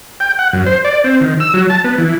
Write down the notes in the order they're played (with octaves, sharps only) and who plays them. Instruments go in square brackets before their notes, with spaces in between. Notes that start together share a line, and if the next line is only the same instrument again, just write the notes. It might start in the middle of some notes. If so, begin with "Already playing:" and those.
[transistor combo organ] G5
F#5
F#2
C5
D5
C4
D#3
E6
F#3
A5
B3
E3